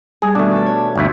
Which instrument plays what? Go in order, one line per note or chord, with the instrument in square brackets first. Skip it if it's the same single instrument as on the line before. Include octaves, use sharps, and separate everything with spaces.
[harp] G3 [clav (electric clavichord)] G#4
[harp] B2 D#3 [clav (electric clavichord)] A3 D4
[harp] A4 D5
C#5
[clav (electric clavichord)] G1 D2 E5